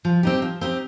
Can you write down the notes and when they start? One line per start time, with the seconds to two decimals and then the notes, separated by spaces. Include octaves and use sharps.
0.05 F3
0.23 C4 D#4 G4
0.42 F3
0.61 C4 D#4 G4